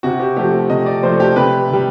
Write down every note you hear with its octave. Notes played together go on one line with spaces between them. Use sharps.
C3 F#4
G4
F3 A3 G4
C3 D#5
D5
F3 A3 C5
G4
C3 B4
D#3 G3